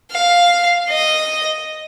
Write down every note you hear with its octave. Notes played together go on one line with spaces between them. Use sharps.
F5
D#5